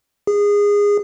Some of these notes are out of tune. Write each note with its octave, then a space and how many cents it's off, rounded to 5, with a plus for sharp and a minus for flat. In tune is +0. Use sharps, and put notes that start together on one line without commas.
G#4 -20